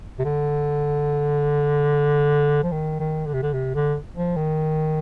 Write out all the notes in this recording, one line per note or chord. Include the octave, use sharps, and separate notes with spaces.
C3
D3
F3
D#3
D#3
D3
C3
D3
C3
D3
F3
D#3